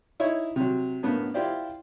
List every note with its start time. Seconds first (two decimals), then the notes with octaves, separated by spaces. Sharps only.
0.20 D#4 E4 C#5
0.56 C3 F#3
1.03 F#2 A2 D3 A#3 B3
1.34 E4 F4 G4 C5 D5